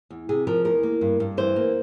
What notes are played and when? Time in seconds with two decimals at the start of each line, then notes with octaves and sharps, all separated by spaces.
0.10 E2
0.29 C3 G#4
0.47 F3 A#4
0.65 E2 A#4
0.83 A#3
1.01 G2
1.20 G2
1.37 E3 C5
1.56 A#3